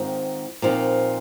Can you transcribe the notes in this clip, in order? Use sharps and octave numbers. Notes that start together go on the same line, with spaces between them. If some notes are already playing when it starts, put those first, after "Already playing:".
Already playing: G#2 D#3 C4 F4
A#2 F3 C4 D#4